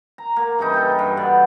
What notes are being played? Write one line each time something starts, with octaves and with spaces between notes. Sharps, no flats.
A#5
A#3
G2 C#3 E3 D#4
A4 G5
G2
B2 B3 D5